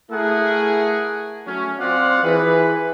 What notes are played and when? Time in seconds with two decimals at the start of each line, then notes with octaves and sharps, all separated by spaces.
0.11 A3 E4 G#4 A#4 F#5
1.46 F#3 A3 C#4
1.79 C4 F4 D5 F5 F#5
2.24 E3 G#4 B4